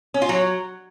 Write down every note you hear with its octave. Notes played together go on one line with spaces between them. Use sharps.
C#4
F4
F#3